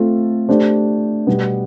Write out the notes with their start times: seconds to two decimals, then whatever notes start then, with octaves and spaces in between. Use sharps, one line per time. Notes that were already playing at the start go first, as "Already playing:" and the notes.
Already playing: A3 C4 F4 A4
0.49 A3 D4 G4 C5
1.27 B2 G3 B3